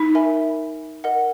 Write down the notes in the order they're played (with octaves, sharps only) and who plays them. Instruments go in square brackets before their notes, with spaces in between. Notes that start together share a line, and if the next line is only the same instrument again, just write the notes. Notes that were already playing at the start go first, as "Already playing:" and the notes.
Already playing: [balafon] D#4
[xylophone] A#4 E5 G#5 B5
A#4 D#5 F#5